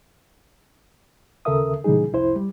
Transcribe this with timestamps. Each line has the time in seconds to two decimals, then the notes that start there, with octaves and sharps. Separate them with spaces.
1.45 D#2 C#3 A4 A#4 E5 D#6
1.84 A#2 C#3 E3 G3 D#4 G#4
2.12 C2 F2 E4 C5
2.36 G3